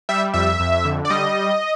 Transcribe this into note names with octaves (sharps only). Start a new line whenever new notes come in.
G3 E5
F2 E5
F2
D3
D5
G3 D#5